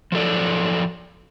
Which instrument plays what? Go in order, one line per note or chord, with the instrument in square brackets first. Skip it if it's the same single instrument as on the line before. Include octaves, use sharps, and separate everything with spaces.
[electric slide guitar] F3 F#3 A4 D5